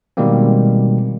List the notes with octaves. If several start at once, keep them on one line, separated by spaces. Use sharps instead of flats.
B2 D#3 G3 G#3 A#3 C4